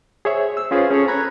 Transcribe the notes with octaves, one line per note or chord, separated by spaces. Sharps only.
G#4 C5 C#5 E5
E6
C#4 F4 G#4 B4 C5
C#4 G#4 A4 C#5
A#5 B5 F#6 G#6